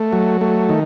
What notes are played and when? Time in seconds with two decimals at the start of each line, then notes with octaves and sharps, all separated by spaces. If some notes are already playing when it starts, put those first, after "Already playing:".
Already playing: A3
0.12 F#3
0.41 A3
0.69 D#3